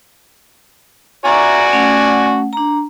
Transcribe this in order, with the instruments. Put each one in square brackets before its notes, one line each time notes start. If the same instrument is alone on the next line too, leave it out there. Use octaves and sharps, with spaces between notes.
[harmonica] F#4 D5 G#5 [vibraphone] E5 A#5
[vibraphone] A3 C#4 F#5
D4 A#5